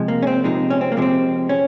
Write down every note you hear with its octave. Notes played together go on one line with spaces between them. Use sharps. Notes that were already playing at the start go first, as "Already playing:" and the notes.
Already playing: C3 F3 G#3
A#3
C#4
C4
F2 C3 F3 G#3 D#4
C#4
C4
A#3
F2 C3 F3 G#3 C4
C#4